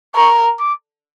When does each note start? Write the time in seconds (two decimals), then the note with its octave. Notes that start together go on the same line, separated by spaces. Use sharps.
0.15 A#4 C#6
0.60 D6